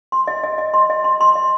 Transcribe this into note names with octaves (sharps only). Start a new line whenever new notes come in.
C6
D#5
D#5
D#5
C6
D#5
C6
C6
D#5